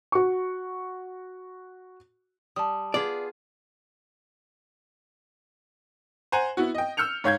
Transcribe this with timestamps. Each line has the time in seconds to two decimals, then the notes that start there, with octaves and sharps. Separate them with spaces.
0.12 F#4 C#6
2.56 G3 A5 D#6
2.94 B3 F4 G#4 D5
6.32 C5 F#5 G#5 A#5
6.57 B3 E4 F#4
6.75 D#5 G5
6.97 E6 F6 G6 C#7 F7
7.24 G#2 C#5 F5 G6 G#6